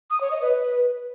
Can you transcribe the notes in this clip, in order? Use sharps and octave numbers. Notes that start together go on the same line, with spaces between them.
D#6
C#5
D#5
B4